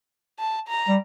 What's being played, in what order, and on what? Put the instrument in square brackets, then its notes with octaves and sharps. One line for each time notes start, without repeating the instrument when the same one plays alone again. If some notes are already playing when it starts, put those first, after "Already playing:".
[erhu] A5
A#5
[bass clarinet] G3